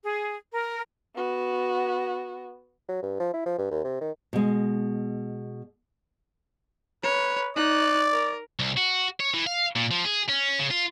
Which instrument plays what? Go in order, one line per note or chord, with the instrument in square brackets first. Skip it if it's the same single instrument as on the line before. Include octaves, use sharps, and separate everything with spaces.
[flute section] G#4
A#4
[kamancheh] B3 F#4
[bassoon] F#3
G2
F3
E4
F3
G2
D#2
C3
D#3
[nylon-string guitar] B2 G#3
[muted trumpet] B4 [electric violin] C#5
[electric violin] D#4 F#6 [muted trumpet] D5
[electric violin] A#4
[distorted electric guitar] C2
F#4
C#5
E3
F5
A#2
F3
G#4
C#4
C#3
F4